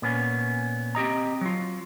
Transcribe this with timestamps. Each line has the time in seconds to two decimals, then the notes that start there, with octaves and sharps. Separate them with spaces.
0.02 A#2 B3 C#4
0.95 C4 G4 D#5 A#5
1.41 F#3 F4